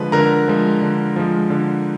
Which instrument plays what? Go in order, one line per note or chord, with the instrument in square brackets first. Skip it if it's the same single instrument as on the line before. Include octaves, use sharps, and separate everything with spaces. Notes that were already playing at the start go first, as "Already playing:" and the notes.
Already playing: [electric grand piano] D3 F3 G#3 B4
D3 A#4 A#5
F3 G#3
D3
F3 G#3
D3